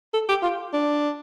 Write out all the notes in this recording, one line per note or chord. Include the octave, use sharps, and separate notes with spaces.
A4
G4
F4
D4